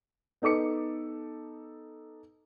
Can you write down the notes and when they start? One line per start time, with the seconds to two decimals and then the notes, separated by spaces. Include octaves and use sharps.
0.42 B3 D#4 A4 D6 C#7